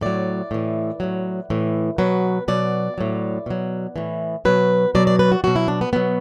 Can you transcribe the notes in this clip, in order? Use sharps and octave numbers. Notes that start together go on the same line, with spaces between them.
A2 F#3 D5
A2 E3
A2 F#3
A2 E3
B2 F#3 B4
B2 F#3 D5
A2 F#3
B2 F#3
A2 E3
B2 F#3 B4
B2 F#3 D5
D5
B4
F#4
B2 F#3 F#4
E4
D4
B3
B2 F#3 B3